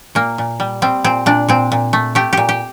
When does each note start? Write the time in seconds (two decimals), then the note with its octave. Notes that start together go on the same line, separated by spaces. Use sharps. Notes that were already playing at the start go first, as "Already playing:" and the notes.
0.15 A#2 A#3
0.38 A#2
0.60 G3
0.82 G3 C4
1.04 A#2 C4
1.26 A#2 D4
1.48 A#2 C4
1.72 A#2
1.93 A3
2.15 A3 G4
2.33 A#2 G4
2.49 G4